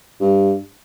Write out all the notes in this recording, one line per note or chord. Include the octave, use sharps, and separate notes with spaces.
G2